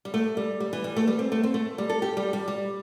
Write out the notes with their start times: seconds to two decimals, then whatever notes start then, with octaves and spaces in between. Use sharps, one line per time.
0.05 G3
0.14 A3
0.37 G3
0.60 G3
0.73 E3
0.84 G3
0.97 A3
1.08 G3
1.19 C4
1.32 A3
1.43 C4
1.54 A3
1.78 G3
1.89 A4
2.02 G4
2.17 G3
2.33 G3
2.48 G3